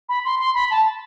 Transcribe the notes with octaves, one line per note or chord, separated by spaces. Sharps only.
B5
C6
C6
B5
A5